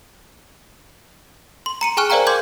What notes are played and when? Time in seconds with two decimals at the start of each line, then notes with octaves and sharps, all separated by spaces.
1.66 C6
1.81 A#5 C#7 D#7
1.97 G#4 G5 G#5 C#6 F6 F#6
2.10 A#4 C5 D5 F5 G5 A#5
2.27 C6 D6 G6 G#6